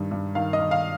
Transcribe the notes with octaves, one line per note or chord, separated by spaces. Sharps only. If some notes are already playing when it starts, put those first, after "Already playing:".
Already playing: G2 D#3
G2
D#3 F5
D#5
D#3
F5